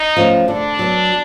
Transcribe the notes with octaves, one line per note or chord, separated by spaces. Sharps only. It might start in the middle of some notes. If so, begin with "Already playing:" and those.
Already playing: D#4
F3 A3 C#4
D3 D4
F#3 B3